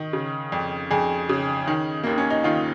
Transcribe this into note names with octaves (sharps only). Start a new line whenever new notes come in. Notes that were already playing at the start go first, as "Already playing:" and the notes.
Already playing: D#3
C#3
F2
F2 G#4
C#3
D#3
D#2 A#3
C#4
D#4
D#3 F4